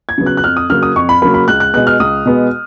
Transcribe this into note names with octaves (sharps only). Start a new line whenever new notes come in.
G#6
C#3 F#3 B3
F#6
F#6
F2 F6
D#6
C#3 F#3 A#3 F6
D#6
F2 C#6
B5
C#3 F#3 A#3 B5
B5
C#2 F#6
F#6
B2 G#3 B3 F#6
F6
C#2 D#6
B2 G#3 B3